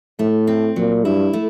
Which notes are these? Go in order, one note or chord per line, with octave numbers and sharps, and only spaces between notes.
A2 A3
C4
A#2 F#3
G2 E4
A3